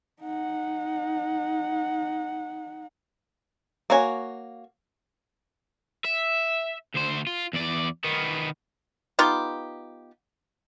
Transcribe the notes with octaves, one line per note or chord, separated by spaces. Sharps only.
D#4 F#5
A#3 F#4 C#5 G#5
E5
D2 C5
F4
E2 D5
D#3 B3
B3 D#4 F4 G4